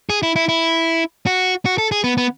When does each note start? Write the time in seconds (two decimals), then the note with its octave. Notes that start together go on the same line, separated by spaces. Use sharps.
0.10 G#4
0.23 E4
0.36 E4
0.49 E4
1.26 F#4
1.65 F#4
1.78 A4
1.91 G#4
2.04 B3
2.17 B3